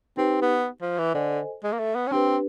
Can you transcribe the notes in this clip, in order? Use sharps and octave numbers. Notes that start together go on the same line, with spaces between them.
C4 D#4 G4 B4
B3
F3
E3
D3 A4 C5 D#5 G#5
G#3
A#3
A3
B3
C#4
C4 D4 G4 B4